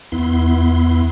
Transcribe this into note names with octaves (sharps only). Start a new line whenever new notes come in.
E2 B3 E4 C6